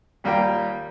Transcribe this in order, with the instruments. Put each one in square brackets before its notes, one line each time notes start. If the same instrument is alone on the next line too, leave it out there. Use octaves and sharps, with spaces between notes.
[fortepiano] D#2 G3 A#3 F4 G5